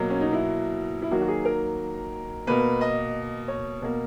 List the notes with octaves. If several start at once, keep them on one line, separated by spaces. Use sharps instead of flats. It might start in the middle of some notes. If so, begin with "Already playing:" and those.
Already playing: B2 F#3 A#3
C#4
D#4
E4
E4
D#3 F#3 A#3 F#4
F#4
G#4
A#4
B2 A#3 B4
D#5
C#5
B2 A#3